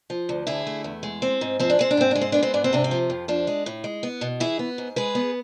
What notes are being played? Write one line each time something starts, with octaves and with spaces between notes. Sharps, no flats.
F3
D2
D3 E4 G#4
A3
E2
G#3
C4
G#2
F3 C4
D4
G#3 C4
D4
G#2 C4
G#3 D4
C4
B3 D4
C4
G#2 D4
C4
C3 D4
C4
F3
F2
F3 D4
G#3
A2
G#3
B3
B2
E3 E4 G#4
B3
G#2
G#3 G#4 B4
B3